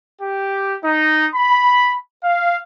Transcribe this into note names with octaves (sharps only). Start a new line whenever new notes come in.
G4
D#4
B5
F5